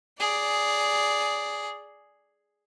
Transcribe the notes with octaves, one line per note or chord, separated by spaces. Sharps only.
G#4 D5